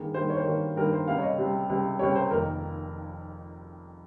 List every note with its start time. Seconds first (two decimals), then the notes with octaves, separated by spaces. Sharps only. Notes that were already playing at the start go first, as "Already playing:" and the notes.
Already playing: G2 D#3 A#3 G#4
0.14 G2 D#3 A#3 C5
0.30 C#5
0.37 C5
0.45 G2 D#3 A#3 C#5
0.76 G2 D#3 A#3 A#4
0.92 C5
1.07 C#2 C3 G3 C4 F5
1.18 C#5
1.23 D#5
1.38 C#2 C3 G3 C4
1.69 C#2 C3 G3 C4
1.99 C#2 C3 G3 C4 C#5
2.15 C5
2.30 F1 F2 D#3 A#3 D#4 A#4